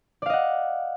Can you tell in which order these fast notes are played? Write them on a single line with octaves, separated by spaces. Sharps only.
D5 F5 D#5 F#5